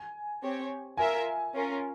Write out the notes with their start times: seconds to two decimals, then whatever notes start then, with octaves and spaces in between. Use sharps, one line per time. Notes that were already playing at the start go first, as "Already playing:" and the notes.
Already playing: G#5
0.43 C4 G4 C#5
0.97 F4 A#4 E5 G#5
1.54 C#4 F4 A#4